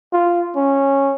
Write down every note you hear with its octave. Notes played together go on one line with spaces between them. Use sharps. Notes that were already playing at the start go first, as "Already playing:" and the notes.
F4
C#4